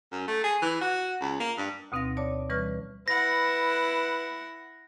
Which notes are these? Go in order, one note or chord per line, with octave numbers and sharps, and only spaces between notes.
F#2
A3
G#4
E3
F#4
C#2
A#3
G2
D2 B2 C4 D#4 F5 A#6
C#5 D5 A5 D6
E3 G3 B4 C#6 F6
E4 B4 F#5 A#6